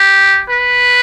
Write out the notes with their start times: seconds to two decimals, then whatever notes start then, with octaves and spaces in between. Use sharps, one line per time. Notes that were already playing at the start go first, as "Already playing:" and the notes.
Already playing: G4
0.50 B4